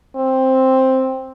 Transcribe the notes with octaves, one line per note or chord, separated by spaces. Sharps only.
C4